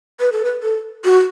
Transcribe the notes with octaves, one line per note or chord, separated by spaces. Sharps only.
B4
A4
B4
A4
F#4